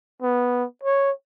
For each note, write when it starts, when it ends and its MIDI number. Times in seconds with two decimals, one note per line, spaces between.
0.22 0.64 59
0.83 1.11 73